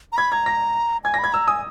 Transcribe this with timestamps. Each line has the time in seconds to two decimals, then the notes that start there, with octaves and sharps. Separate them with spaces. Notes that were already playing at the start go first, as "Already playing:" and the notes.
0.12 A#5
0.17 B5 G#6
0.32 A#5 G#6
0.46 A#6
1.04 G#5 G#6
1.14 A#6
1.19 B5
1.24 G#6
1.33 A#5 E6
1.48 G#5 D#6